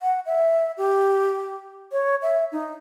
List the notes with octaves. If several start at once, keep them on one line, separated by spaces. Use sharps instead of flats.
F#5
E5
G4
C#5
E5
D#4